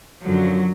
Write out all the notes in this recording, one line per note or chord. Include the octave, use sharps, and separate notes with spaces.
F#2 D3 F3 F#3